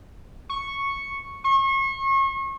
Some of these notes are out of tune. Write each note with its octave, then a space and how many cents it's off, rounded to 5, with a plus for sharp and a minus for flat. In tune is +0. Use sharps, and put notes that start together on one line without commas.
C#6 -5
C#6 -35